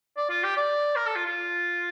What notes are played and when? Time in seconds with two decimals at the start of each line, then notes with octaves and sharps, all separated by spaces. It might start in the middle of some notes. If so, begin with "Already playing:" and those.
0.17 D5
0.30 F4
0.43 G4
0.57 D5
0.96 A#4
1.06 A4
1.16 F4
1.26 F4